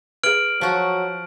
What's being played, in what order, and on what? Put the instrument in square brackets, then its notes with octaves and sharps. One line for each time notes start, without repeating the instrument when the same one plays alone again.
[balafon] G#4 B4 [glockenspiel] F6 D7 F#7
[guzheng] F3 F#4 F#5 [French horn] F#3